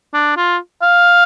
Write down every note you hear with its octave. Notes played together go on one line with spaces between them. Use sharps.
D4
F4
F5